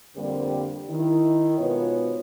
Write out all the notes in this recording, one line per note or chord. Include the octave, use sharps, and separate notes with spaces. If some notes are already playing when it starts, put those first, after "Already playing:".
F2 D3 G3 A#3 C4 G4
D#3 E4
G#2 B2 B3 F4 C#5